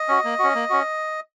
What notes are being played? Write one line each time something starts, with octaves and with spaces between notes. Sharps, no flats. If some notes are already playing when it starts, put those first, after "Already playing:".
Already playing: D#5
C#4 F#4
A#3
C#4 F#4
A#3
C#4 F#4